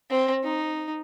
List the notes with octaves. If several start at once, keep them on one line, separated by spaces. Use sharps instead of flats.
C4
D#4